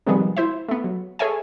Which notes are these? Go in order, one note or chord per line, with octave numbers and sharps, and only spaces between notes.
C3 D#3 F3 G3 G#3 B3
E4 C5 E5
A3 B3
F#3
G#4 A4 C#5 E5 G#5